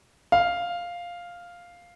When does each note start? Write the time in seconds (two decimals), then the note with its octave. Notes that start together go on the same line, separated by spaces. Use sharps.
0.32 F5